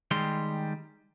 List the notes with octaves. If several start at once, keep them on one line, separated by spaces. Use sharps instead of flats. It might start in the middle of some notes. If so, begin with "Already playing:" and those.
D#3 G3 G#3 C6